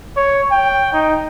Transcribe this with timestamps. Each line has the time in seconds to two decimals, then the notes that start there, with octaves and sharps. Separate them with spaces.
0.17 C#5
0.52 G5
0.93 D#4